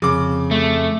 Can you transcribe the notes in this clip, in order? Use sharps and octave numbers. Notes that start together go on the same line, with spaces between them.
F2 C#3 D6
A3